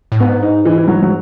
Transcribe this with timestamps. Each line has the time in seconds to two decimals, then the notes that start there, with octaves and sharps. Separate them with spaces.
0.12 A2
0.20 G#2 B3
0.43 D#4
0.65 E3
0.78 E3
0.88 F#3
1.02 F#3